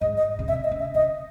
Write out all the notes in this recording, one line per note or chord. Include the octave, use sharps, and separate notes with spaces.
G#2 D#5
D#5
C#3
C3 E5
D#5
C#3
E5
C#3 D#5